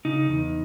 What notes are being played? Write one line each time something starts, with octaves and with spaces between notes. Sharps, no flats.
C#3 D#4
E2